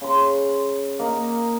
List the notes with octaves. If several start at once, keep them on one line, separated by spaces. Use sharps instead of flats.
C#3 C6
A#3 D#4